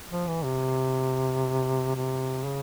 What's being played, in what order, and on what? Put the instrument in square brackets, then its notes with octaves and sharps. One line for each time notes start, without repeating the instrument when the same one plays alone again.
[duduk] F3
E3
C3
C3
C#3